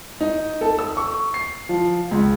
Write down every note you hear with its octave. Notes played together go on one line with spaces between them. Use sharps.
D#4
A4
E6
C#6
C7
F3
C#2